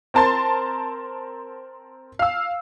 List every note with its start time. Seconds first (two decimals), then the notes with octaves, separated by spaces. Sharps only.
0.14 C4 A#4 A5 C6 A6
2.19 F5 E6